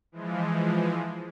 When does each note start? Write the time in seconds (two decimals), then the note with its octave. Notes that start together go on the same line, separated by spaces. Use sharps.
0.12 E3 F3 G#3